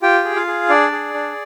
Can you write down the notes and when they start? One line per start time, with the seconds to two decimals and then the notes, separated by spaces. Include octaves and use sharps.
0.02 F4 G4 G5
0.25 G#4
0.36 F4 F5
0.47 G#4
0.69 D4 D5
0.92 G#4
1.14 D4